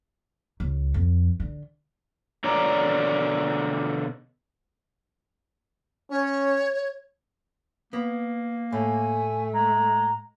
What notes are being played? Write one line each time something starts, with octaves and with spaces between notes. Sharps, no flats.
C#2
F2
D3
B2 D3 C#5 D5 A#5
C#4 C#5
A#3 B3
A2 A3 G#5
G#3 A#5